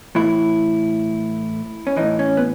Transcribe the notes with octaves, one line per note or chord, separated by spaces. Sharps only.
A2 E3 E4
C#4
A2 E3 D#4
C#4
B3